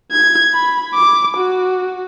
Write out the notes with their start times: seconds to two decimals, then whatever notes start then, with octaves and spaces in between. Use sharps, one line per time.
0.12 G#6
0.53 B5
0.94 D6
1.36 F#4